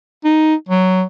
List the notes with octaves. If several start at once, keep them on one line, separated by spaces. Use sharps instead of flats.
D#4
F#3